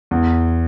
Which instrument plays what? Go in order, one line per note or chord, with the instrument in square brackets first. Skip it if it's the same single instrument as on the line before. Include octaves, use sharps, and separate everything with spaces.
[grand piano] E2